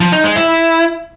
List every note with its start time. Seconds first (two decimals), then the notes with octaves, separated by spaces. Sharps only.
0.01 F3
0.12 D#4
0.24 G#3
0.36 E4